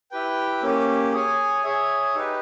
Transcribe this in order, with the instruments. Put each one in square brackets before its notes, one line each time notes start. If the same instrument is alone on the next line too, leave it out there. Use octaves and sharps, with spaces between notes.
[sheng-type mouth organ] E4 G4 B4 G5
A#3 C#4 G4
G#4 C#5 G#5
G#4 C#5 E5
D#4 G4 B4